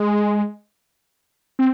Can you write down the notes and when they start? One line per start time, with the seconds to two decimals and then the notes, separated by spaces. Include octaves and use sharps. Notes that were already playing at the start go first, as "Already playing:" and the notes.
Already playing: G#3
1.59 C4